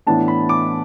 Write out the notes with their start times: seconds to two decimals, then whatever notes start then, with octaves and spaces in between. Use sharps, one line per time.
0.06 A2 E3 B3 D4 A5
0.28 B5
0.49 D6